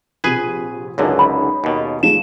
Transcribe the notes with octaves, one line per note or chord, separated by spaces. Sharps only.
A#1 C3 G#4 B4 G#5
C#2 F#2 D3 C#4 D#4 G#4
B5
D#2 B2
F3 G#3 A3 E7